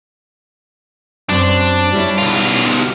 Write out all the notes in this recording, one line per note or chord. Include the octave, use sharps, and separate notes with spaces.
F#2 C4 D4 C5
G3 E4 C#5
B1 F4